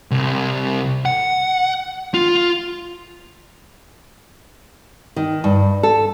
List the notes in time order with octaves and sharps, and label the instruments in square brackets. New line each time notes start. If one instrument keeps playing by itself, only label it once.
[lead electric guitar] C2
F#5
F4
[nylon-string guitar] D#3
G2
A4